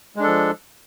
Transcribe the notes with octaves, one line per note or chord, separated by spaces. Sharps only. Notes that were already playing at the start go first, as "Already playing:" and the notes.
F3 G#3 D4 A4